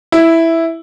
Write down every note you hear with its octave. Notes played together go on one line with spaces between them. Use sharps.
E4